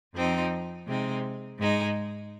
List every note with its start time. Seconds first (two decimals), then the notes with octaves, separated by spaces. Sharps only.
0.15 F2 F3 C4 D#4
0.87 C3 G#3 C4 D#4
1.57 G#2 G#3 D#4